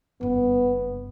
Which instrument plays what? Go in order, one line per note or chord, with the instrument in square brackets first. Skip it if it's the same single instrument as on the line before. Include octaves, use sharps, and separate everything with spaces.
[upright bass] F#1 G2 [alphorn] B3